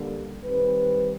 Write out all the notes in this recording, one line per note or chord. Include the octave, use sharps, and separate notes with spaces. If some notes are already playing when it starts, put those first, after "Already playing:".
Already playing: D3 G3 A#3
D#3 G3 C4 B4